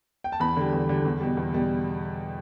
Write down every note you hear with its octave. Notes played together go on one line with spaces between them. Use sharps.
G5
A5
E2 B5
D3 G3
E2
D3 G3
E2
B2 G3
E2
B2 G3